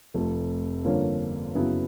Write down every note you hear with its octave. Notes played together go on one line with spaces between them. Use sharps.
F1 F2 C3 F3 A3
G2 D3 F3 A#3 C#4
F#2 C#3 F#3 B3 E4